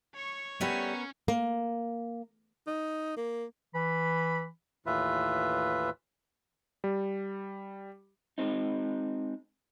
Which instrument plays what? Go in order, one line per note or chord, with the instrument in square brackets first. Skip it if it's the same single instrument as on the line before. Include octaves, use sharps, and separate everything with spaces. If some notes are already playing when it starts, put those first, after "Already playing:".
[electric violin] C#5 C#6
[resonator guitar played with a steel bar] G3 A3 [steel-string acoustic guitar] B3 A#4 B4 [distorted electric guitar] C#4
[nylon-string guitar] A#3
[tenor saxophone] D#4
A#3
[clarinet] E3 [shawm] B5
[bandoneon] D#2 A2 E3 F4 B4 E5
[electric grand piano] G3
[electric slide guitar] G#3 C4 D#4